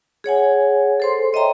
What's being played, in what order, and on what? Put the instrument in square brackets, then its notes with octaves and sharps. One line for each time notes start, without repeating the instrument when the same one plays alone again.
[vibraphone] G#4 C#5 F#5 G#5
A4 C5 C6
C#5 D#5 E5 G5 A#5 C6